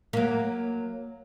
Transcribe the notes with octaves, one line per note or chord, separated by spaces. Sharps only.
F#3 A#3